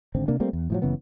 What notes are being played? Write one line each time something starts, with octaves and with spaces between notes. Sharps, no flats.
G#1 D3 C4
C3 A#3 D4
G3 A3 A#3 C4
E2
A2 F3 F#3
F#1 C#3 E3 B3